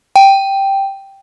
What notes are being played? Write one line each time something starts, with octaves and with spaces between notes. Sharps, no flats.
G5